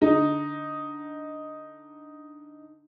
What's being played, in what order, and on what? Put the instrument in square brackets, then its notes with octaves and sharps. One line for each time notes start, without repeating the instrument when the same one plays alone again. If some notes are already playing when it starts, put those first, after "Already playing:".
[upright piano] D3 D#4